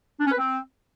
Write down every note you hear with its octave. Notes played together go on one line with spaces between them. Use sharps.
D4
C#4
B4
C4